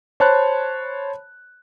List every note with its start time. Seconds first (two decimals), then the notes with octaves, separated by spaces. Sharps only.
0.20 C5 C#5 A5 B5 F#6